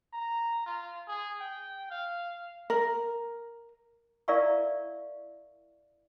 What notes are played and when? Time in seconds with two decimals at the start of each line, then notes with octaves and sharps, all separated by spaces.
0.13 A#5
0.66 F4
1.08 G#4
1.41 G5
1.91 F5
2.70 A#4
4.28 E4 A#4 D5 E5 F5 C#6